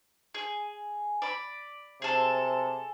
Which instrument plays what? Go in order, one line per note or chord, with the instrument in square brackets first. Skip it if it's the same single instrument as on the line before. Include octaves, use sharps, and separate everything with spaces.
[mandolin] G#4
D5 B5
[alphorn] C3 [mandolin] G#4 A4